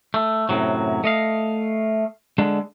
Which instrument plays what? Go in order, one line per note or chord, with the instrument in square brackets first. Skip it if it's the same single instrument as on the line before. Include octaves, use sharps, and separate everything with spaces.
[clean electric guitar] A3
F#2 A2 C3 F#3
A3 D#5 F5
D3 G#3 D4